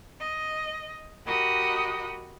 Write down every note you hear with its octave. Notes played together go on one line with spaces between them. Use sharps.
D#5
F#4 G4 A#4 D#5 B5 D#6